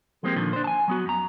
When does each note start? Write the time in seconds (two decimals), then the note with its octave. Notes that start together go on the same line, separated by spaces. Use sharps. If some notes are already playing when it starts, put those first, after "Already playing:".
0.23 F3 G#3 A#3 C4 G4
0.36 A#2 D3 D#3 F3
0.53 D4 C5
0.64 G#5 A5
0.88 F#3 B3 F#4
1.06 F#2 A#5